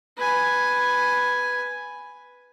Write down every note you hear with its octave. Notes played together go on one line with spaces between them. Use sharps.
B4 G#5